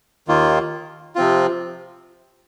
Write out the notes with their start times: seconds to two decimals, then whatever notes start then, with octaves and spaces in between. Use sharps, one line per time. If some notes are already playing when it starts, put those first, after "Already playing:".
0.28 D#2 D#3 A#3 F4
1.15 C3 F3 C4 F4